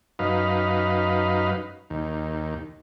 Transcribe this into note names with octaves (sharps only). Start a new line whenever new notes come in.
F#2 D#4 B4 F5
D#2